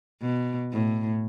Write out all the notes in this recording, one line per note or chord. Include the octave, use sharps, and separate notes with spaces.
B2
A2